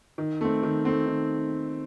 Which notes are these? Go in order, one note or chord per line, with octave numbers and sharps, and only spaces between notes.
D#3
A3 C4
D#3
A3 C4
D#3